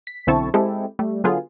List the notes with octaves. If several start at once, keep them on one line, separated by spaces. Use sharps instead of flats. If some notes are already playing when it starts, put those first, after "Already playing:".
B6
B1 D3 C4 E4 A5 C#6
G#3 C4 E4 G4 A4
G3 A3
D3 F#3 B3 F4 G#4 A4